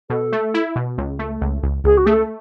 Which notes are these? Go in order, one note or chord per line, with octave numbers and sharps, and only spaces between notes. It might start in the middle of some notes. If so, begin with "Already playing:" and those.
B2 A4
A3
E4
B2
C#2
A3
C#2
C#2
C#2 G#4
F#4
A3 G#4
A4